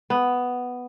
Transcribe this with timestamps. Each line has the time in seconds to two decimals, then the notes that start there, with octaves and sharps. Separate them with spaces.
0.10 B3